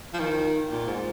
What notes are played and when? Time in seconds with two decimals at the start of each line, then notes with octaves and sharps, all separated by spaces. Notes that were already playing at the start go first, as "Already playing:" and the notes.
0.13 F3
0.19 D#3
0.71 A#2
0.87 G#2